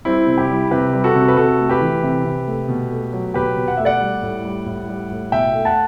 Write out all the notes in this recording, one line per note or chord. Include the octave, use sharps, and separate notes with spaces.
G3 C4 E4
C3
E4 G4
G3
C3 G4 B4
G3
F#4 A4
C3
B4
C3 F#4 A4
A3
G4 B4
E3
C3
C3
A3
B2
A3
F#3
B2 G4 B4
B2
F#5
A3 E5
D5 F#5
G3
A2
G3
A2
G3
A2
B2 E5 G5
A3
F#5 A5